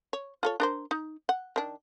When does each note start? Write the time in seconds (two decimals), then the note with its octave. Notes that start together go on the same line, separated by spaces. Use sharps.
0.13 C#5
0.43 F4 A4 C#5
0.60 D4 A#4 C5
0.91 D#4
1.29 F#5
1.56 D#3 D4